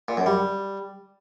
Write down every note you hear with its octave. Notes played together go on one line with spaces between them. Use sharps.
A#2
F#2
G3